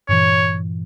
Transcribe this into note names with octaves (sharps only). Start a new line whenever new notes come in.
G2 A#2 E3 C#5